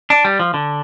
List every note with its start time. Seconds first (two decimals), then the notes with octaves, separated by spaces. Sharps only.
0.10 D4
0.25 G3
0.39 F3
0.54 D3